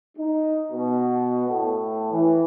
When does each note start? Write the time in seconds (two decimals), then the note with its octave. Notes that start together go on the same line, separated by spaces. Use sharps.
0.18 D#4
0.71 B2
1.48 A2
2.12 E3